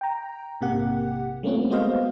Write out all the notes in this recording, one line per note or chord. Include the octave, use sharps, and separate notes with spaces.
G5 A#5
A#1 G#2 C3 A#3 G4 F#5
G3 A3 A#3 C4 C#4 F4
G#3 B3 F#4 C5 D#5 F5